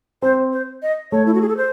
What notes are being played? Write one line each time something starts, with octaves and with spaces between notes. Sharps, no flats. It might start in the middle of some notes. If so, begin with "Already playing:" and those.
C4 C5
C5
D#5
A3 C#5
E4
F#4
G#4
A4
C5